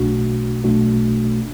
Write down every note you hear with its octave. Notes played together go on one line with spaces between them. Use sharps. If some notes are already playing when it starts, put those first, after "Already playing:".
Already playing: B1 B2 A3 D4 F#4
B1 B2 A3 D4 F#4